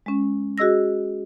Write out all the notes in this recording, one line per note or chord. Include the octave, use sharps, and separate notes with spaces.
G#3 C#4
F#4 G#4 D#5 E6 A#6